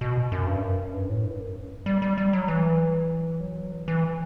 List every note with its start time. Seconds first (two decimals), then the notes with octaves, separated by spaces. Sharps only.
0.01 B2
0.32 F#2
0.46 G2
0.62 F#2
0.94 G2
1.09 A2
1.24 G2
1.40 F#2
1.86 G3
2.02 G3
2.18 G3
2.33 F#3
2.48 E3
3.40 F#3
3.72 E3
3.88 E3